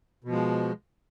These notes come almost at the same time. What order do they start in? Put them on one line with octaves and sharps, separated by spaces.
B2 F3 G#3